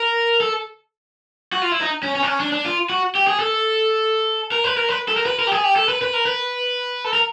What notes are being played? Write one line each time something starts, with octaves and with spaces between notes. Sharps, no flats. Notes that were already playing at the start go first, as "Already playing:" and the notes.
Already playing: A#4
A4
F#4
F4
E4
D#4
C#4
C#4
D4
C#4
D4
D4
F4
F#4
G4
G#4
A4
A#4
B4
A#4
B4
A4
A#4
B4
A#4
G4
G#4
G4
A4
B4
B4
A#4
B4
A4
A#4